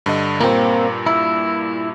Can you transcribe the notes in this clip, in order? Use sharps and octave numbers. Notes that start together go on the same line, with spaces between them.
G2 D3 D#5
G2 A#2 A#3 C4
E4